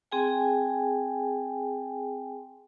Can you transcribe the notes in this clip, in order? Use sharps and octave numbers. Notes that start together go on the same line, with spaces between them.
C4 G#4 G5 G#5